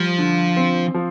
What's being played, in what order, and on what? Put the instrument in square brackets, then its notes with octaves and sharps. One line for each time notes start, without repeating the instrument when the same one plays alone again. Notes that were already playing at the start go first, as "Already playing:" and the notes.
Already playing: [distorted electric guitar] F3 [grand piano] G3
[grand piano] D3
C4
F3